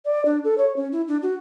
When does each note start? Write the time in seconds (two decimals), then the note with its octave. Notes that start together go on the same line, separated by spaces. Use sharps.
0.05 D5
0.25 D4
0.44 A4
0.58 C#5
0.76 C#4
0.92 E4
1.08 D4
1.23 F#4